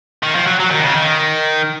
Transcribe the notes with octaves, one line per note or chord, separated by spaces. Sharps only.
D#3
F3
F#3
F#3
D#3
B2
C#3
D#3